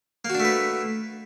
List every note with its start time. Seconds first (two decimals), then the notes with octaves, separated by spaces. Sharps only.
0.25 A#3
0.30 F#4
0.35 D4
0.40 A3
0.45 B4